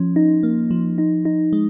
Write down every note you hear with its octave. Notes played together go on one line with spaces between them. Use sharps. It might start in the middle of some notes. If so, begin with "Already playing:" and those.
Already playing: F3 C#4
D#4
A#3
F3
D#4
D#4
G#3